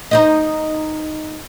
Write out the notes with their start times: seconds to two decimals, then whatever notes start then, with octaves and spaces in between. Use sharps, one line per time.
0.11 D#4 C5 D#5